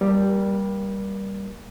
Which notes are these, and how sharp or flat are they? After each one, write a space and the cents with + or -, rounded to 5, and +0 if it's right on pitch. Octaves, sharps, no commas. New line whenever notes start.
G3 +0 A#3 +0 A#4 +30